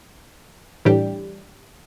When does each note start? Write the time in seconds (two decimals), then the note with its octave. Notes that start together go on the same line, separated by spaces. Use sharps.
0.85 A2 E3 G3 D4 G4